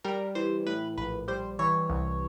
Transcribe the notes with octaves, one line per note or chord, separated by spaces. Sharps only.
G3 A#4
E3 C5
A2 B4
A#1 B4
G3 C5
E3 C#5
C2